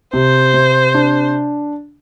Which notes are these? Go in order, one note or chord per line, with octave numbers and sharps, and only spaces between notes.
C3 C5
C3
D4